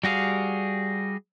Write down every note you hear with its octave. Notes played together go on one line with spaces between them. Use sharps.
G3 F#4 G#4 F5